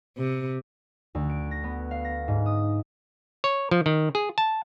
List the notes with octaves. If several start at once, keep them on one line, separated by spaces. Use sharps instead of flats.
C3
D2
D7
A#6
B3
F5
A#6
G#2
D#6
C#5
F3
D#3
G#4
A5